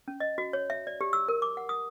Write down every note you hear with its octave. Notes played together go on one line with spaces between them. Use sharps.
C#4
D#5
F#4
C#5
E5
D5
G4
E6
A#4
D6
F#5
D#6